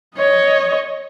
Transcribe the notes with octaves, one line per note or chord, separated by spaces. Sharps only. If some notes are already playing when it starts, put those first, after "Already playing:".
C#5 D#5